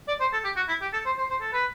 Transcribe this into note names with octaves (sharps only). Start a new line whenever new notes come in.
D5
C5
A4
G4
F#4
E4
G4
A4
C5
C5
C5
A4
B4